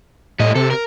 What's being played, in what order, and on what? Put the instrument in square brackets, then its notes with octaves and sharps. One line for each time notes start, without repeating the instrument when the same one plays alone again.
[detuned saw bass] A2 [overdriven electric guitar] G3 D#5
[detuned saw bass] C3 [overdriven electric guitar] A4
[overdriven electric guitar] A#4